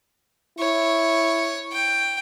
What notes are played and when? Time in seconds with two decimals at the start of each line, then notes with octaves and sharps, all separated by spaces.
0.59 E4 C#5
1.72 G5